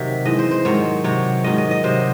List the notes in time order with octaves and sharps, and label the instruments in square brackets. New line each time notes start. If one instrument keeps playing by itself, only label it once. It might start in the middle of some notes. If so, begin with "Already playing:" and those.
Already playing: [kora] C3 D#3 F#3 E5
G#2 E3 D#5
C5
C5
G#2 D#3 F#3 C#5
C3 F#3 C#5
G#2 D#3 F#3 D#5
D#5
D#5
C3 F#3 C5